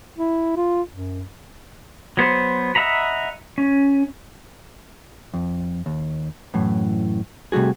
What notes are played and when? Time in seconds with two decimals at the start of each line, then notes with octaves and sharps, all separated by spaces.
0.18 E4
0.56 F4
0.92 F#2
2.17 F#3 B3 C5
2.75 D#5 E5 F#5 A#5 B5
3.58 C#4
5.34 F2
5.86 D#2
6.54 F#2 A2 E3
7.52 C3 G3 A3 F#4 G#4